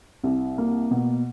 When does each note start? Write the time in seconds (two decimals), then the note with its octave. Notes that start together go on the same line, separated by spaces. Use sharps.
0.23 C2
0.58 A#3
0.91 B2